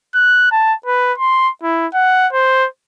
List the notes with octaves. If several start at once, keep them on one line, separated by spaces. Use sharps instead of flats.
F#6
A5
B4
C6
E4
F#5
C5